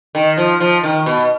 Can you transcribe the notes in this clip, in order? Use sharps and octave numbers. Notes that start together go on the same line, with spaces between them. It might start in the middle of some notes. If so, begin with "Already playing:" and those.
D#3
F3
F3
D#3
B2